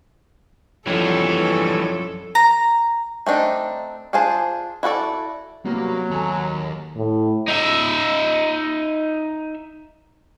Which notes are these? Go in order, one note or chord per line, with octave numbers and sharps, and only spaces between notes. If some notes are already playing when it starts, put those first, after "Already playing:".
F#2 E3 F3 G3 G#3 D4 A4 C#5
A#5
A3 C4 D4 D#4
D4 F4 G#4 C5 A5
E4 F#4 A4 D5
C3 F#3 G3 A#3 B3 F#4
D#2 A4 G#5 A#5
A2
D#4 E5